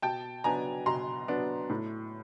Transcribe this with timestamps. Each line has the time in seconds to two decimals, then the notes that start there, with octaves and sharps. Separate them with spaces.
0.02 B2 G5 A5
0.44 F#3 B3 D4 G#5 A#5
0.86 B2 A#5 C6
1.28 F#3 B3 D4
1.70 A2